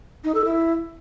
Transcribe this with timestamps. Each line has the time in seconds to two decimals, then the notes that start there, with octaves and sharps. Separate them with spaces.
0.24 D#4
0.35 A4
0.45 E4